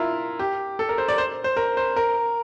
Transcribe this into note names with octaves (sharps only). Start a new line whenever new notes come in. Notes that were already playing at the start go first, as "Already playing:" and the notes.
Already playing: E4 F4 A#4
G4
A4
A#4
C5
D5
C5
C5
A#4
C5
A#4